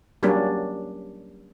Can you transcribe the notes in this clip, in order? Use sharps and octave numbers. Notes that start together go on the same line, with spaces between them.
F#3 G3 A#3 C#4 D4